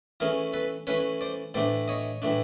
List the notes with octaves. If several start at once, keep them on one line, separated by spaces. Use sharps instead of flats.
E3 A3 C#4 G#4 A#4
A4 B4
E3 A3 C#4 B4 C#5
C5 D5
A2 E3 A3 D4 C5 D5
C#5 D#5
A2 E3 A3 D4